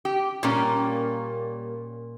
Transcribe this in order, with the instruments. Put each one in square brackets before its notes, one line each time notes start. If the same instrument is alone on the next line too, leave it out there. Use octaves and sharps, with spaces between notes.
[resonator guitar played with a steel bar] G4
[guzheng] A#2 [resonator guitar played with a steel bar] G3 A#3 C#4